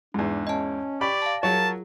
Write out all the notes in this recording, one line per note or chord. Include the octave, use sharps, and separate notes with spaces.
E2 G#2 D4
C#4 D#5 A5
G4 D5 B5 C#6
F5 A5
F#3 F4 G#4 A#4 C#5 A5